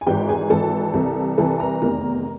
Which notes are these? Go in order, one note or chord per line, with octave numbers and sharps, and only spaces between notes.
G#5
G#1 G#2 E3 G4 G5
G#4 G#5
G#1 G#2 E3 A4 A5
C2 C3 E3
C2 C3 E3 A4 A5
A#4 A#5
F1 E2 C3 D#3 A#4 A#5